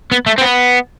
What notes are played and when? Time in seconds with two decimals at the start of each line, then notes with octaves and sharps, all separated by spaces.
0.12 B3
0.26 A3
0.38 C4
0.41 B3